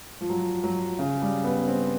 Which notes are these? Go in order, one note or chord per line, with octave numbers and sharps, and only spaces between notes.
F3
F#3
F#3
C#3
G3
B3
C4